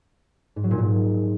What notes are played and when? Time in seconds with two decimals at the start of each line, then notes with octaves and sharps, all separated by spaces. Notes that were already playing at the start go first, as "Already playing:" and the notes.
0.56 G#2
0.64 F#3
0.71 A#2
0.78 G#2